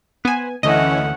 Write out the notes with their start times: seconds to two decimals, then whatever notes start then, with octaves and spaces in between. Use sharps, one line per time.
0.25 B3 B4 C5 G#5
0.63 D2 D3 E3 A3 C#4 D#5 F#5